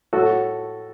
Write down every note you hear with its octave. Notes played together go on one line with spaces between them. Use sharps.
A2 F#4 A4